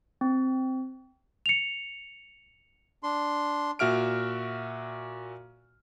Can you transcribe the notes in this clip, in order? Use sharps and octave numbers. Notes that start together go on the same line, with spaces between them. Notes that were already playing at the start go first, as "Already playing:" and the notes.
C4
C#7 F7
D4 C6
A#2 F#4 E5 F6 D7